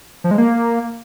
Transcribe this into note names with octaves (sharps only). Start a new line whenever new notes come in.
F3
G#3
A#3